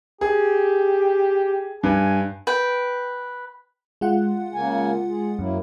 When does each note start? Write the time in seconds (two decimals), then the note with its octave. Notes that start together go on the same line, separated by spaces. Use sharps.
0.21 G4 G#4
1.83 G2 G#5
2.47 B4 G5
4.01 G#3 F4 F#5
4.54 C#3 A#3 G#5
5.08 G#4
5.39 F#2 F#3 A#3 E4